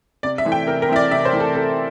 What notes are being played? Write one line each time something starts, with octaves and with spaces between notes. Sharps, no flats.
C3 D5
E5
E3 A3 C4
G5
C3 A#4
A#4
E3 A3 C4 E5
D5
C3 E5
C5
E3 A3 C4
A4
C3 A4